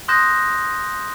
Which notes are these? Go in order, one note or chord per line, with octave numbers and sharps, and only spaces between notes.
C6 D#6 F#6 G6 A#6 E7